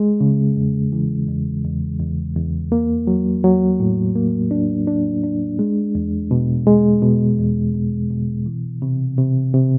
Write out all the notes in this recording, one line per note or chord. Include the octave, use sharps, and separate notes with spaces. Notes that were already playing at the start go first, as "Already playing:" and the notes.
Already playing: G#3
C#3
E2
E3
E2
E2
E2
E2
A#3
F#3
F#3
A2
A#3
D4
D4
D4
G#3
E2
B2
G#3
B2
E2
B2
B2
E3
C3
C3
C3